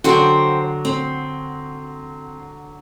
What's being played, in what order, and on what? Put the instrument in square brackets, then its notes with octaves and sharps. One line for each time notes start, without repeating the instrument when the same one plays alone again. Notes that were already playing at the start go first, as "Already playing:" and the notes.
[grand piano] D3 F#3 [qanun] D4 F#4 [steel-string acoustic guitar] C5 G5
[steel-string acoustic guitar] C4